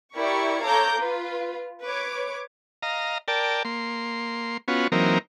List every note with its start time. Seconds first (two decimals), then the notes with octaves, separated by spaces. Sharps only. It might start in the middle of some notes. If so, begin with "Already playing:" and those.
0.15 E4 G4 A#4 D5 C#6
0.64 A4 C#5 F5 A#5 D6 G6
0.97 F4 B4
1.84 B4 C#5 D6
2.82 D#5 F5 A#5
3.28 A#4 D5 G5 A5
3.65 A#3 C6
4.68 B3 C#4 F4 F#4
4.92 E3 F#3 A#3 C4 D#4 A#4